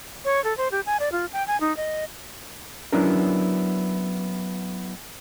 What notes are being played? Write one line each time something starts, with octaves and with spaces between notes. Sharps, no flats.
C#5
A4
C5
G4
G#5
D5
F4
G5
G#5
D#4
D#5
F#3 B3 C#4 D4 E4 A#4